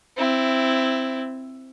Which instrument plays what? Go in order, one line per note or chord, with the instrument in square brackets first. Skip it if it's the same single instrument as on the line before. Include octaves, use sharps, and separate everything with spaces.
[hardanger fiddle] C4 E4